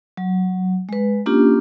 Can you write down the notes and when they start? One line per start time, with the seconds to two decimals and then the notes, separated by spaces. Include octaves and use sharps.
0.17 F#3
0.89 G#3 B4
1.26 A#3 C#4 D4 F4 G4